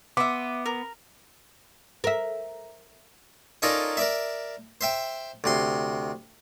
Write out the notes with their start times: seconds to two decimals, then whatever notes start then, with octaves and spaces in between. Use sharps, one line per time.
0.17 B3 E5 C6 D6
0.66 A#4
2.04 A#4 E5
3.62 C#4 D#4 F4 A4 A#4 D5
3.97 A#4 D5 E5
4.81 C5 E5 G5
5.44 D2 C3 C6